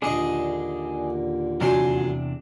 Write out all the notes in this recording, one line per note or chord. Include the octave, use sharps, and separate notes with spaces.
A#1 D#2 A#2 D3 D4 G#4 D#5 C#6
E2 C3 F#3 D4 G#5 C6